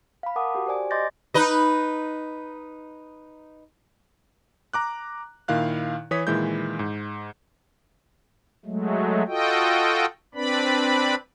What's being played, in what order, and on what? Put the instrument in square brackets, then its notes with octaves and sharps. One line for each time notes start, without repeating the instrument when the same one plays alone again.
[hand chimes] F5 B5
A#4 F#5 A5 D6 D#6
F#4 G4
G4 C5 D5 G#5
D#5 C6 D6 G6 A6 A#6
[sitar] D#4 B4 D#5
[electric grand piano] A#5 D6 F#6
A#2 D#3 E4 F5 F#6
E3 C#5 D#6 B6
A#2 D#3 E3 G#3 E4 G6
G#2
[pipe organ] F#3 G#3 A3
F4 F#4 A4 D#5 G5
C4 D4 B4 D5 B5